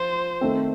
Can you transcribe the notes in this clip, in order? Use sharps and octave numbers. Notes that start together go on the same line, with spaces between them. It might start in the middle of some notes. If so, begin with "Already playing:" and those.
Already playing: F3 F4 C5
D#3 A3 C4